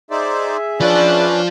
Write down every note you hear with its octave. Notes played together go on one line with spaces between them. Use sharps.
D#4 G#4 C5 D5 E5
F3 C#4 D4 F4 B4 D5